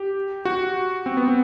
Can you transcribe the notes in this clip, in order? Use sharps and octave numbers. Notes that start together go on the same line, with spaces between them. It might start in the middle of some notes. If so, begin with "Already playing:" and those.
Already playing: G4
F#4
C4
B3
C4